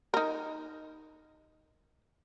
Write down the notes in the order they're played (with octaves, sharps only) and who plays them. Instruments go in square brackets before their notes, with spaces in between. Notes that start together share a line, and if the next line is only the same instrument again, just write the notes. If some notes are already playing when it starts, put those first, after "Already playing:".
[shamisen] D#4 A#4